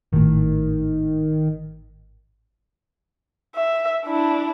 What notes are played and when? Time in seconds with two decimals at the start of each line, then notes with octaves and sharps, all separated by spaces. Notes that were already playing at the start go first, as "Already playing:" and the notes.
0.13 G#1 A2 D#3
3.55 E5
4.06 D4 E4